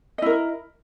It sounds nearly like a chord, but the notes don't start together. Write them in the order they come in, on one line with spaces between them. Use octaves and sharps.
D#5 E4 A#4